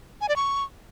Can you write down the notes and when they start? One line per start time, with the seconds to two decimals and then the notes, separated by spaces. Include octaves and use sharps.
0.21 G#5
0.29 D5
0.36 C#6